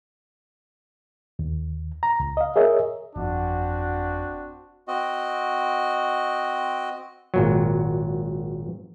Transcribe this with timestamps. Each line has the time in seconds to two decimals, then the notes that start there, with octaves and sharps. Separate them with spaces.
1.39 D#2
2.03 A#5
2.20 C#2
2.37 D#5 F5
2.56 G#4 A#4 C#5 D#5 E5
3.16 G1 F2 C4 D4 F#4
4.88 C4 F#4 D#5
7.34 G#1 A#2 F#3